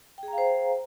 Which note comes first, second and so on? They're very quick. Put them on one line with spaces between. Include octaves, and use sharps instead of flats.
G5 G#4 A#5 F5 C5